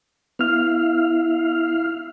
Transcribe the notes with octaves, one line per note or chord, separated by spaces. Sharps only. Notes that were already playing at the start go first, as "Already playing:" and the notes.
B3 E4 F5 F6